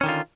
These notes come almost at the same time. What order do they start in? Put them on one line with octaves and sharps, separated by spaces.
C#4 D#3 D3 F4